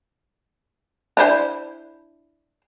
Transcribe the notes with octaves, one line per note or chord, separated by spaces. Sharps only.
D4 E4 C5